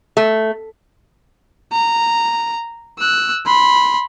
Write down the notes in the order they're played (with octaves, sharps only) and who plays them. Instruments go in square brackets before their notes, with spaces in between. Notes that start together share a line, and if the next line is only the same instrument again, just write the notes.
[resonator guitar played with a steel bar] A3
[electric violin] A#5
E6 F#6
B5 C6